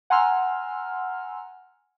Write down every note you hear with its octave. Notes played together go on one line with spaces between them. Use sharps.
F#5 G#5 A#5 C6 E6 F6